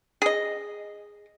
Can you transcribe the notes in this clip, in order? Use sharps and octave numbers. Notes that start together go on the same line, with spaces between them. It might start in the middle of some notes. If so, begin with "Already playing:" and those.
G#4 D#5